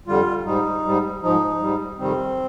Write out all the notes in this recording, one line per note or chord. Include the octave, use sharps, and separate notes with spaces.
F2 D3 G3 F4
G#2 G3 D#4
G#2 G3
G#2 F3 D#4
G#2 G3
F2 C3 D#3 G3 C4